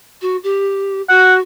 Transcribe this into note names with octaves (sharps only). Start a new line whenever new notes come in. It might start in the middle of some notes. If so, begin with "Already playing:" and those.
F#4
G4
F#4 F#5